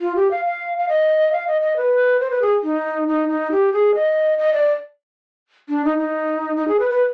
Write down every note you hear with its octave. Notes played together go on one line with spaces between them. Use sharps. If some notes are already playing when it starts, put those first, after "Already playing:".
F4
G4
F5
F5
F5
D#5
F5
D#5
D#5
B4
C5
B4
G#4
D#4
D#4
D#4
G4
G#4
D#5
D#5
D5
D4
D#4
D#4
D#4
G#4
B4
B4